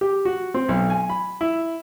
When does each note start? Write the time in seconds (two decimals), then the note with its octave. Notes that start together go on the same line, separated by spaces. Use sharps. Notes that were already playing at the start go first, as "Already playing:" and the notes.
0.01 G4
0.25 F#4
0.54 C4
0.69 B1
0.90 G#5
1.09 B5
1.41 E4